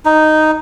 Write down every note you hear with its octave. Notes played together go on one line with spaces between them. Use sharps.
D#4